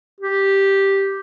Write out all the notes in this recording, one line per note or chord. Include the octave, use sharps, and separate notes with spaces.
G4